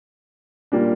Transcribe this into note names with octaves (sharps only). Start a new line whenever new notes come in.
A#2 G3 A#3 D4